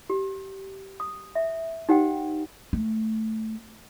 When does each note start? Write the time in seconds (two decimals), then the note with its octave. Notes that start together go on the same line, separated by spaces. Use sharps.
0.10 G4
1.00 D#6
1.35 E5
1.89 D#4 G4 C5 F#5 G5
2.73 A3